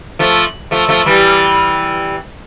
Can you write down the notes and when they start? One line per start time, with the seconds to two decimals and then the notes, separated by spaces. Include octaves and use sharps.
0.19 F3 A3
0.71 F3 A3
0.88 F3 A3
1.06 E3 G3